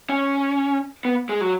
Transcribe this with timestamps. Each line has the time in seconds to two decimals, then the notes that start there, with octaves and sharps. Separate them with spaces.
0.09 C#4
1.05 B3
1.29 G#3
1.41 F#3